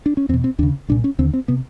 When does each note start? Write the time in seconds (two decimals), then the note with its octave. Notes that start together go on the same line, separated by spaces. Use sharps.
0.06 D4
0.17 C#4
0.29 E2 C4
0.34 B2
0.44 C4
0.59 D#2 D4
0.63 C#3
0.89 C2 A#2 D4
1.04 C#4
1.19 D#2 D3 C4
1.34 C4
1.48 C3 B3